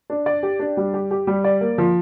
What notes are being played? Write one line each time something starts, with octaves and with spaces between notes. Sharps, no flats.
D4
D5
G4
D4
G3
G4
G4
G3
D5
A#3
F3